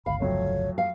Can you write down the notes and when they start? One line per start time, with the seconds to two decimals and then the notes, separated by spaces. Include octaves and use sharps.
0.06 G1 C#2 F5 B5
0.20 F2 F#3 A3 C#5
0.78 F5